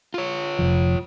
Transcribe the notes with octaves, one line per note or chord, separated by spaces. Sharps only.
F4 C#5
F1 F3